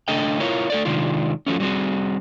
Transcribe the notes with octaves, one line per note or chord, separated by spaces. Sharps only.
D3 A3 D4 A4 D#5 G5
E4 F4 A#4 C#5
A3 A4 D5
C3 D#3 G#3 D4 F4
F3 F#3 A3 C#4
F#3 G3 C4 F#4 G#4